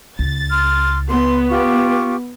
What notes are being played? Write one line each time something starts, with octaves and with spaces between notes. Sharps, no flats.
C#2 A6
C6 F6
B3 C6
F4 G4 C#6